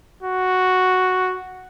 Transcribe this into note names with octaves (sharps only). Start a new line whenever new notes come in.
F#4